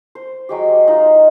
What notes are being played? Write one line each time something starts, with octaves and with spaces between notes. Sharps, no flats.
C5
F#3 G#3 G4
D#4 F4